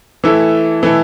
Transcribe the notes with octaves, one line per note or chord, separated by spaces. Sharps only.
E3 A3 E4 A4
E3 A3 E4 A4